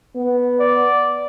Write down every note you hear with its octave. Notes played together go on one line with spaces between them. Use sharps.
B3
D5